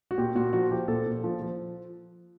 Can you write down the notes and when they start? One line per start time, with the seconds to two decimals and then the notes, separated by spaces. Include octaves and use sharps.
0.11 F#4
0.18 A#2 G4
0.35 A#2 F#4
0.53 F3 F#4
0.71 F3 G4
0.88 A#2 A4
1.06 A#2
1.24 F3
1.42 F3